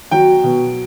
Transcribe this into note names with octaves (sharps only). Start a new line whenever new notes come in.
F#3 G5
B2